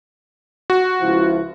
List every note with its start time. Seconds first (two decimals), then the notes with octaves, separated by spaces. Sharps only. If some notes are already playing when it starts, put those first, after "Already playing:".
0.70 F#4
1.01 C#2 F3 E4